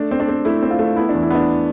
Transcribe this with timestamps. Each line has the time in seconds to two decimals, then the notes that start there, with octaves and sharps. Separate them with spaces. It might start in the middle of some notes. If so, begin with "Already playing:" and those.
Already playing: A3 D4
0.11 C4
0.20 D4
0.28 C4
0.45 A3 E4
0.63 C4
0.71 F4
0.79 A3
0.96 B3 E4
1.09 E2 D4
1.22 E4
1.31 B3 D4